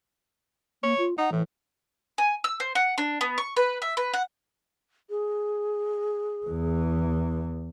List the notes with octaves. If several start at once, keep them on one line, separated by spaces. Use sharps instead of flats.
A#3 C#5
F4
D#4 F#5
A2 E3
G#5
E6
C5
F#5
D4
B3
C#6
B4
E5
B4
F#5
G#4
E2 E3